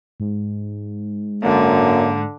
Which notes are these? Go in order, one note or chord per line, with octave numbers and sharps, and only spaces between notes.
G#2
F#2 D3 A#3